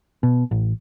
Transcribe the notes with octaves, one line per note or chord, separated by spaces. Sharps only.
B2
A1